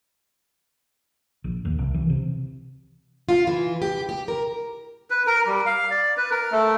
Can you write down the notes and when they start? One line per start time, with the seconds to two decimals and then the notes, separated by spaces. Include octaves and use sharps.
1.44 A#1
1.65 D#2
1.79 C2
1.94 E3
2.10 C3
3.29 F4
3.47 E3
3.82 G4
4.09 G4
4.28 A#4
5.10 B4
5.27 A#4
5.46 G3
5.66 F5
5.91 D5
6.17 B4
6.31 A#4
6.52 A3